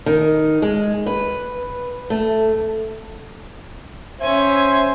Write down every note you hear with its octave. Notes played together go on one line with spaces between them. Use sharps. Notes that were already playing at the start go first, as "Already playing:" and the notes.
D#3
G#3
B4
A3
C#4 C5 E5 G#5